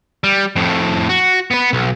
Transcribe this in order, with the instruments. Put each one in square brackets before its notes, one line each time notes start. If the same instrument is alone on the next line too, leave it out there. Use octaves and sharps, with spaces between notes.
[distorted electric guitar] G3
F2 A2
F#4
B3 B4
B1